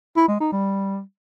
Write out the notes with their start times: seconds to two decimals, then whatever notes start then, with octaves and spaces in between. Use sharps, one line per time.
0.16 E4
0.28 G#3
0.40 D#4
0.52 G3